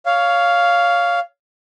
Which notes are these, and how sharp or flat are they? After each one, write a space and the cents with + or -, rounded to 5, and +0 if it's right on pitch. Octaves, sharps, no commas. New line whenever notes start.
C#5 +20 F5 +0